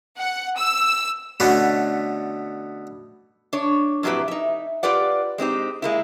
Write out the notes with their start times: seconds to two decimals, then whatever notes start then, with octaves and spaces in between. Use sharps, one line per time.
0.18 F#5
0.58 E6
1.40 B2 D3 A3 B3 C#4
3.53 D4 C#5
4.03 F2 A#2 F#3 E4 G4 B4
4.28 D#4 E5
4.83 F4 G4 B4 D5 F#5
5.38 G#3 C4 D#4 G4
5.82 G#3 A#3 E4